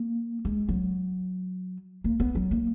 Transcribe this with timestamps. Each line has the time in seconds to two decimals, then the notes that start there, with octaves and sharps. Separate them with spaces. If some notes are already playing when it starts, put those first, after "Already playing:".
Already playing: A#3
0.45 G#3
0.69 F#3
2.04 A#3
2.20 B3
2.35 F#3
2.51 A#3